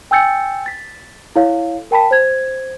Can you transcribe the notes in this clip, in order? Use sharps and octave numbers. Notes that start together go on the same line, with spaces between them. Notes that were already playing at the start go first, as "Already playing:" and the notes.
G5 G#5 E6 G6 A6 C#7
A6 B6
E4 A4 C#5 F5
A#4 G5 A5 B5 B6
C5 G#6